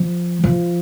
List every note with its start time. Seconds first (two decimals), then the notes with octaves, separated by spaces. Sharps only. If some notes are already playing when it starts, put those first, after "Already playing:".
Already playing: F3
0.44 F3